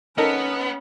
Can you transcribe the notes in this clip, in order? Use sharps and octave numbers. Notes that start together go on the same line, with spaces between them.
B3 C#4 D#4 A4 A#4